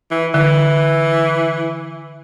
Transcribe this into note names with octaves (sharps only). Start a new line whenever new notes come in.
E3
D3 E3